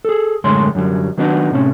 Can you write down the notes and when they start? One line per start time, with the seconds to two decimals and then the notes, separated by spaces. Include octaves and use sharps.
0.05 G#4 A4
0.44 F#2 A2 D3 G#3 C#5 C6
0.75 F#2 D3 F#3 G3
1.18 D#3 F#3 B3 D4 D#4 F#4
1.52 A2 C3 C#4